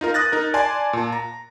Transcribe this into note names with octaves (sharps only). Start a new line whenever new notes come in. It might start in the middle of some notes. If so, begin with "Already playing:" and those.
D#4 F4 A#4
D#6 F#6 A6 A#6
D#4 A#4
D5 G#5 A5 C6
A#2 A5
A#5